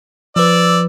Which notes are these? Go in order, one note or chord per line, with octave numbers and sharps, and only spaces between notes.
F3 B4 D5 E6